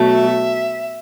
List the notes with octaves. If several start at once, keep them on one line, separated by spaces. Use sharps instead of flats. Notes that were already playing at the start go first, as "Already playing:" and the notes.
Already playing: B2 F#3 A3
E5